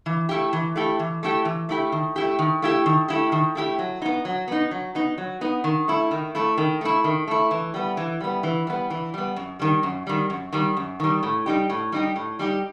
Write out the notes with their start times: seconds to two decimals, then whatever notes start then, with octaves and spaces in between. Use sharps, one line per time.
0.06 E3
0.29 A3 E4 G4
0.53 E3
0.76 A3 E4 G4
0.99 E3
1.23 A3 E4 G4
1.45 E3
1.69 A3 E4 G4
1.92 D#3
2.16 A3 E4 G4
2.39 D#3
2.62 A3 E4 G4
2.86 D#3
3.08 A3 E4 G4
3.32 D#3
3.55 A3 E4 G4
3.79 F#3
4.02 B3 D#4
4.25 F#3
4.48 B3 D#4
4.71 F#3
4.95 B3 D#4
5.18 F#3
5.41 B3 D#4
5.64 D#3
5.88 A3 E4
6.11 D#3
6.35 A3 E4
6.58 D#3
6.81 A3 E4
7.04 D#3
7.28 A3 E4
7.51 E3
7.74 G3 B3
7.97 E3
8.21 G3 B3
8.43 E3
8.67 G3 B3
8.90 E3
9.14 G3 B3
9.36 F#2
9.60 D#3 G3
9.83 F#2
10.07 D#3 G3
10.30 F#2
10.53 D#3 G3
10.77 F#2
11.00 D#3 G3
11.23 A2
11.46 G3 D#4 G4
11.70 A2
11.92 G3 D#4 G4
12.16 A2
12.39 G3 D#4 G4